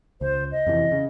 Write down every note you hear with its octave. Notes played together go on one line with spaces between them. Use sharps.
C#2 C5
D#5
F2 C3 E3
C#3